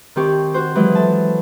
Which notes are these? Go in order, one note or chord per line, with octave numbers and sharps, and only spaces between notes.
D#3 C4 G4 C#6
F#4 C5
E3 F#3 G#3
A4 A5